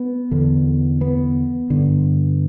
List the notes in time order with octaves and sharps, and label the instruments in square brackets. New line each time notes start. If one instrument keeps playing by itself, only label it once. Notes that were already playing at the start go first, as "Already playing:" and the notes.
Already playing: [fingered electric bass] B3
E2 D3
B3
G2 D3